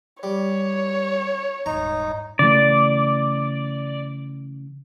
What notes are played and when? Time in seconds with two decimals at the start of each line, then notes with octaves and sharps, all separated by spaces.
0.23 G3 C#5
1.66 D#1 G#2 D#4 A#5
2.39 C#3 E3 A3 D5